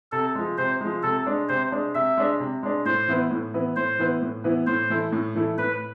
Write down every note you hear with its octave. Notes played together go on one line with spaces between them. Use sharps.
C3 A4
F3 G#3
C3 C5
F3 G#3
C3 A4
G#3 D4
C3 C5
G#3 D4
C3 E5
G#3 D4
C3
G#3 D4
A2 C5
E3 B3 E4 B4
A2
E3 B3 E4 B4
A2 C5
E3 B3 E4 B4
A2
E3 B3 E4 B4
A2 C5
E3 A3 E4
A2
E3 A3 E4
A2 B4